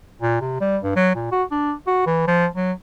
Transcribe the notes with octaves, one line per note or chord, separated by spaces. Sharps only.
A#2
C3
G3
G2
F#3
A#2
F#4
D4
F#4
E3
F3
F#3